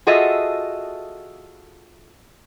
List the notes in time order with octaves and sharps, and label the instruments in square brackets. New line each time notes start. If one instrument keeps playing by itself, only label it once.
[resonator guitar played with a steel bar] F4 F#4 G#4 A4 D#5 E5